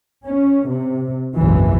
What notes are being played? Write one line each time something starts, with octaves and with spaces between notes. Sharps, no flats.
C#4
C3
F#1 B1 G#2 E3